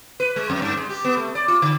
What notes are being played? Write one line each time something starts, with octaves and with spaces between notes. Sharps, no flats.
B4
G#3
F2
G2
G#3
G4
B3
A3
D5
F4
D3